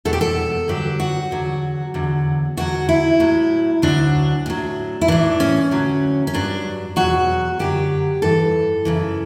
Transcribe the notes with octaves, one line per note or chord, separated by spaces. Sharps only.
E2 B2 F#3 A4
G4
A4
G2 D3 F#3 G4
F#4
E2 D3 F#3
E2 D3 F#3
E2 D3 F#3 F#4
E4
A2 F#3
D2 D3 F#3 D4
A2 F#3
E4
A2 E3 D4
C#4
D2 D3 F#3
C#4
G2 F#3 D4
E2 B2 F#3 F#4
F#2 D3 F#3 G4
G2 E3 A4
F#2 C#3 E3